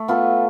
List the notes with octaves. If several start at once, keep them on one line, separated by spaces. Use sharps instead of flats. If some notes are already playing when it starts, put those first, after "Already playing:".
Already playing: A3
B3 F4 A4